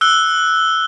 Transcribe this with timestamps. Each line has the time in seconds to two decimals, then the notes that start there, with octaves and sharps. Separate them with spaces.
0.01 E6 F#6 G7